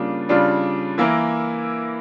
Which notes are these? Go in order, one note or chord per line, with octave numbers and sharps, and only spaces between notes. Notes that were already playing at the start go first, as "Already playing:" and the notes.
Already playing: C#3 G3 A#3 D4 F4
C#3 G3 D4 F4
E3 A#3 E4 A#4